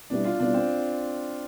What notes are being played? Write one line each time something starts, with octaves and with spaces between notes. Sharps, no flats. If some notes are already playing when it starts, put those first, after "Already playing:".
B2 G3 B3 D4 E4
F4
B2 G3 B3 D4 E4
C4